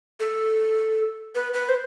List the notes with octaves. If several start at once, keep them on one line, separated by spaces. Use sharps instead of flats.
A4
B4
B4
C5